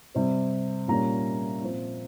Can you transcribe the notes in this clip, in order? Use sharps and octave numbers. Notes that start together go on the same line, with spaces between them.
C3 G3 C4
A#2 G3 A#3 C#4 A#5
A#2 F3 C4